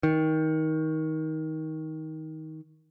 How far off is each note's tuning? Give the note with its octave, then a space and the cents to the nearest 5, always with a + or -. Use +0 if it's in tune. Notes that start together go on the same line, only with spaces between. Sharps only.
D#3 +20